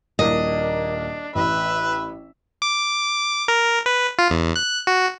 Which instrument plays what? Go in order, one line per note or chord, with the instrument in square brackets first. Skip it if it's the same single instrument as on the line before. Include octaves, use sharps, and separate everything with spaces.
[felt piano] D#1 A#3 E4 [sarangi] D4 [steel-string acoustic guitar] D#5
[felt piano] A1 [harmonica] B4 [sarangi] E5
[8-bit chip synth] D6
A#4
B4
F4
E2
F#6
F#4